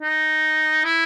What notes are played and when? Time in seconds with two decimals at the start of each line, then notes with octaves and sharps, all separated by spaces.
0.02 D#4
0.84 E4